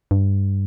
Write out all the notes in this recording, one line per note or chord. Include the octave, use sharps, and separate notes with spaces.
G2